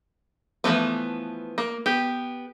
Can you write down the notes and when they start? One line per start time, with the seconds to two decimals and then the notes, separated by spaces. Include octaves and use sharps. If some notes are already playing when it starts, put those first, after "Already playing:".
0.64 E3 F3 G#3 A3 B3
1.58 A#3
1.86 B3 G4